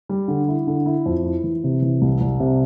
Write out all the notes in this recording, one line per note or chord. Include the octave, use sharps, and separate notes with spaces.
G3
D3
E4
D3
E4
F2
E4
E3
C3
E3
C2
C2
C3